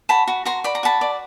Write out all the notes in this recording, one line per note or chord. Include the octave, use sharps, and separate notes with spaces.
F#4 A5 B5
F#4
F#4 A#5 C6
D5 B5
A#5
F#4 A5 B5
D5